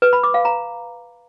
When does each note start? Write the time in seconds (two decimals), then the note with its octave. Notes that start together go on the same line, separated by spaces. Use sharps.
0.02 B4
0.13 B5
0.23 D6
0.34 F5
0.45 A#5